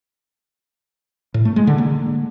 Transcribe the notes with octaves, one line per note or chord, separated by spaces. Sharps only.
A2
A3
G#3
D3
A#3